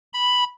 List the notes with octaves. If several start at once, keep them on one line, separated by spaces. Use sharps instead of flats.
B5